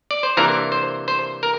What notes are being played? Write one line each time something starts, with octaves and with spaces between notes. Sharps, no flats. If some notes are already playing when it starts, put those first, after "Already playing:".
D5
C5
C3 E3 A#3 D4 A#4
C5
C5
A#4